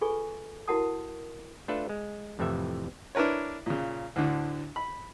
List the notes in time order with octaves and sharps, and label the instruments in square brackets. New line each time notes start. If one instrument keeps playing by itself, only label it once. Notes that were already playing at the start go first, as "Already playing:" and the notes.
[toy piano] F4 G#4 A4 B4 G#5 C#6
E4 F#4 A#4 F#5 A5 D#6
[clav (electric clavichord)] A3 D4 F4 A4 B4
G#3
F2 A2 C3 E3 E5
[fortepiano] D4 E4 A#4 B4 C#5
A#2 C#3
D2 A2 D3
B5